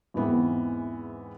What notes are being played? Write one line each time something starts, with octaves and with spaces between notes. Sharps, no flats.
E2 G#2 E3 B3 C4